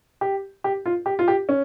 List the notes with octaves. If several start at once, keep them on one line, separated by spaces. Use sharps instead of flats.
G4
G4
F4
G4
F4
G4
C#4